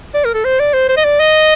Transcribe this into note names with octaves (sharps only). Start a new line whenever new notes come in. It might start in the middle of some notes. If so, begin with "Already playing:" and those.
D5
A#4
A4
C5
D5
C5
C5
D#5
D5
D#5